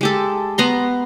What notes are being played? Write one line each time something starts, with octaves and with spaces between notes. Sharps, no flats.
G#3 G4 A4
B3 A#5 C6